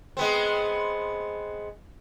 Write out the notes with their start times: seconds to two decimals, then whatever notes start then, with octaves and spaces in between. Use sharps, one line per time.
0.17 G#3 B3 C4